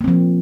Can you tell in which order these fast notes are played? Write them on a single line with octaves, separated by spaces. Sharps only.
A#3 C4 F3